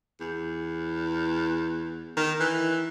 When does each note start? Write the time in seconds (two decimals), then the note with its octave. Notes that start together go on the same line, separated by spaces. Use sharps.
0.20 E2
2.17 D#3
2.40 E3